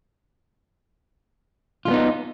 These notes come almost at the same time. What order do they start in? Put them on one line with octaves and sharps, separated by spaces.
F4 G#3 B3 D#4